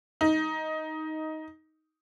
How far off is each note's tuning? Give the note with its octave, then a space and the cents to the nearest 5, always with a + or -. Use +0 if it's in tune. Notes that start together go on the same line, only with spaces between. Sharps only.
D#4 +10